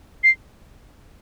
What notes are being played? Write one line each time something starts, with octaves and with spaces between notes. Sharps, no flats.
C7